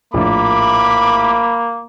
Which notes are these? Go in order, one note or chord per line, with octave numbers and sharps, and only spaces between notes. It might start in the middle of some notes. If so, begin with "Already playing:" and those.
A#1 A2 A#3 B5 D6